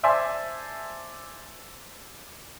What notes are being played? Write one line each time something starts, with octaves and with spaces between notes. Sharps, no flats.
C5 D5 E5 G#5 A5 C6